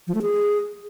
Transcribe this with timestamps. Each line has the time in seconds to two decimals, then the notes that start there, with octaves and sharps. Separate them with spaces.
0.07 F3
0.15 A3
0.22 G#4